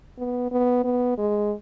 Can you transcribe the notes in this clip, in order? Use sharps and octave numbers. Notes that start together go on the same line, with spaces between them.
B3
B3
B3
G#3